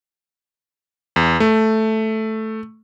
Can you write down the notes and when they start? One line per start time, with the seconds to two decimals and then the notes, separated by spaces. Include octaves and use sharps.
1.16 E2
1.40 A3